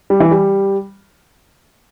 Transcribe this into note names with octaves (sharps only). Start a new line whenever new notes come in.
G3
E3
G3